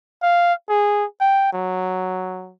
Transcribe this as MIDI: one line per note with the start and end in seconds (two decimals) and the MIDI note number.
0.22 0.53 77
0.69 1.05 68
1.21 1.50 79
1.53 2.53 54